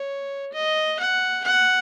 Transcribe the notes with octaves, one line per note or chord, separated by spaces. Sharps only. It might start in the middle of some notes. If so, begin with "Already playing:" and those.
Already playing: C#5
D#5
F#5
F#5